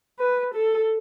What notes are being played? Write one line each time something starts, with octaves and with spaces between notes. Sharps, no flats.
B4
A4